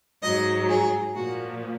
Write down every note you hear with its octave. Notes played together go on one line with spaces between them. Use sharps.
G#2 F#3 D#5
G#4
A#2 F3 F#4